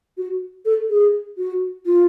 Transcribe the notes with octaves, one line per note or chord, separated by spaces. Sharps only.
F#4
A4
G#4
F#4
F4